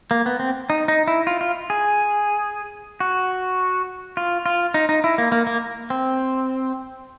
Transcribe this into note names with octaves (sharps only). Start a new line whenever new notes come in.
A#3
B3
C4
D#4
D#4
E4
F4
F4
G#4
F#4
F4
F4
D#4
D#4
E4
A#3
A#3
A#3
C4